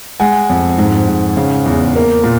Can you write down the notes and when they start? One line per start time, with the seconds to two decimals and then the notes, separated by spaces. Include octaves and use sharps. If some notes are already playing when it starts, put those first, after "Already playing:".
0.20 G#3 F#5 G#5
0.49 F2
0.78 G#2
1.07 G#2
1.37 C#3
1.66 E2
1.96 A#3
2.24 A#2